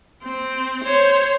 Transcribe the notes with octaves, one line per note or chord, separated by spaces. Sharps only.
C4
C5 C#5